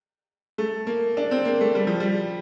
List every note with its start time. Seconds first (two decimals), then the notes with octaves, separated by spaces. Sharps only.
0.58 A3
0.87 A#3
1.17 D4
1.31 C4
1.45 A#3
1.61 A3
1.75 G3
1.87 F3
2.00 G3